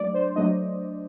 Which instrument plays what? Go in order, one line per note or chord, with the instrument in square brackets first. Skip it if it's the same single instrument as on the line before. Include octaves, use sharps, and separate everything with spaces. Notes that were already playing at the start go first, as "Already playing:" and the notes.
Already playing: [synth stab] F#3 A3 D4 D5
C5
F#3 A3 D4 D#5